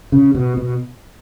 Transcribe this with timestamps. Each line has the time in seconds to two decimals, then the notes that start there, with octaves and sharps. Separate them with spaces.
0.12 C#3
0.35 B2
0.57 B2